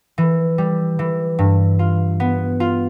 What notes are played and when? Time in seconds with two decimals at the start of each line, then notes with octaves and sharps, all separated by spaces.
0.18 E3
0.58 G3
0.99 E3
1.39 G2
1.79 F4
2.20 B3
2.60 F4